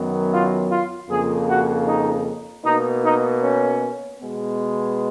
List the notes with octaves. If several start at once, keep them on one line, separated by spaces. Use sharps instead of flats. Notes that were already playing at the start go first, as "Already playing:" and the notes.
Already playing: F#2 D#3 F#3 B3
F4
F4
F2 C#3 F3 A#3 G#4
F#4
D#4
B2 A#3 D#4
D#4
C#4
B2 G#3 B3